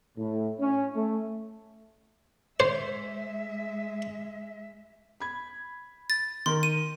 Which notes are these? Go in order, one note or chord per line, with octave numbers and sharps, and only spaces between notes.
A2
C#4
A3
G#3 C5 E5
B5 G#6
A6
D#3 A#4 C6
D#7